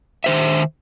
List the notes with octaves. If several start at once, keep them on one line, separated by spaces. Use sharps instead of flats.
D#3 C5 E5